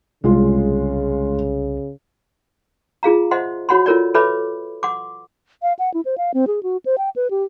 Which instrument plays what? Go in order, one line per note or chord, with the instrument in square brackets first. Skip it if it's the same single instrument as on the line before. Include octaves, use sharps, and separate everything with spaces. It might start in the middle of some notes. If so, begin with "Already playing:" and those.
[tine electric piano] C2 [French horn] C#3 [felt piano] G#3 F4
[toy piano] F4 G#4 F5 A#5
C5 D#5 E5 F#5 C6
F#4 C#5 F#5 B5 C6
F4 A4 A#4 C#5 D5
A4 B4 C#5 E5 B5 D6
F#5 C6 D6
[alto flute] F5
F#5
E4
C5
F5
C4
G#4
F#4
C5
G5
B4
G4